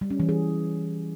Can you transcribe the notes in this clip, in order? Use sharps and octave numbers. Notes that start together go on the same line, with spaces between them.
G3
C#4
E3
G#4